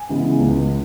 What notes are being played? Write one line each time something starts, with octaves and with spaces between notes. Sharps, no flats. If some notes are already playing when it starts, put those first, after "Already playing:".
Already playing: G#5
C#3 E3 G#3 B3
C#2